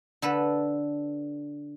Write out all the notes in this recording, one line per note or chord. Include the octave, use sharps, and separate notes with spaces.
D3 A4 B4